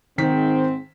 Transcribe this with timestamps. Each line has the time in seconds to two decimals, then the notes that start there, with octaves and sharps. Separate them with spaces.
0.18 G#2 D#3 C4 B6